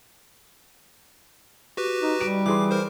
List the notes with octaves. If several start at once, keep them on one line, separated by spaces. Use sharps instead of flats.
F#4 G4 B4
D#4
G3 D7
E3 G#4 C6 D6
A#4 C5